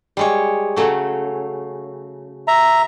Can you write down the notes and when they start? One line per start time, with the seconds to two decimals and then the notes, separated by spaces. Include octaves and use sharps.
0.17 G3 G#3 C#5
0.76 C#3 F#3 A3
2.48 E5 A#5